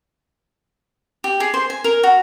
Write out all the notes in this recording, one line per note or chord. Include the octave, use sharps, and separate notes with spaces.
G4
G#4
C5
G#5
A#4
F#4